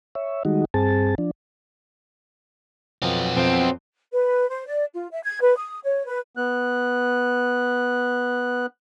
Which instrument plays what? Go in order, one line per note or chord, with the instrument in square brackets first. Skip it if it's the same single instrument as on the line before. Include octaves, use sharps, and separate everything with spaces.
[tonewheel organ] C#5 E5
D#3 G3 G#3 D#4 F#4
G2 C4 G#4 A5
F3 D4
[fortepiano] F2 [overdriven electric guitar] F#3 B3
[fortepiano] F2 [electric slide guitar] C4
[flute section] B4
C5
D5
F4
E5
G#6
B4
D#6
C#5
B4
[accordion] B3 F#6